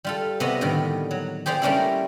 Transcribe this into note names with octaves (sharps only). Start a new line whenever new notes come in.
G3 F4 A4
C3 B3 F#4 D#5 F5
A2 D3 D#3 G3
F#3
G4 G#4 C5 D5 F5
G3 A3 A#3 C#4 D4 E4